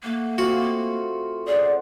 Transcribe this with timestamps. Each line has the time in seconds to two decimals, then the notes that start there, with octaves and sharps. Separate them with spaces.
0.03 A3 A#3 F#5
0.38 C4 F4 F#4 F5
1.48 C#3 G#4 C5 D5 F#5